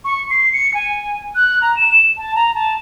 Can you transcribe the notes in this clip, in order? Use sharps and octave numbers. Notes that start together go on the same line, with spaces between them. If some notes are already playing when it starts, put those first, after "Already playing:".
C#6
C7
C#7
G#5
F#6
A#5
E7
A5
A#5
A5